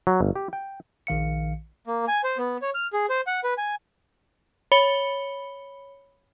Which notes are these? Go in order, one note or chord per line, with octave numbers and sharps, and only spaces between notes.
F#3
G1
G4
G5
A#1 D#3 F5 C#7
A#3
G#5
C5
B3
C#5
F6
G#4
C5
F#5
B4
G#5
C#5 B5 C#7 G7